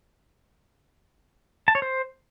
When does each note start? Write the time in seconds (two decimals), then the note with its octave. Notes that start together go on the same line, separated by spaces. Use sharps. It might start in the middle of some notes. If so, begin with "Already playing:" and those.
1.68 A5
1.75 C#5
1.82 C5